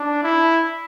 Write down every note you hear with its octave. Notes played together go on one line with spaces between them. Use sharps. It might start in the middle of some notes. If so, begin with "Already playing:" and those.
Already playing: D4
E4